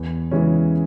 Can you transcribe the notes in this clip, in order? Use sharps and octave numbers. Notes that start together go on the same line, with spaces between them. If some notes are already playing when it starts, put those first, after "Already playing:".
Already playing: E2
C#3 E3 G#3 C#4